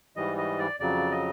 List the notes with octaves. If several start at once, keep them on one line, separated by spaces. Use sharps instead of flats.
G#2 E3 G3 D#5
D#5
D5
F2 C#3 F#3 D5
D#5